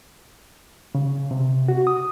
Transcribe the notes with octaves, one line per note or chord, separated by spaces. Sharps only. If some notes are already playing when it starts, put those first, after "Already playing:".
C#3
C3
F#4
D#6